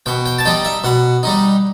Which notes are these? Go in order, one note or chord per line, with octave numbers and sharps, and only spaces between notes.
B2 G5
G5
A5
G3 D#4 G5
E5
B2 F#5
G3 D#4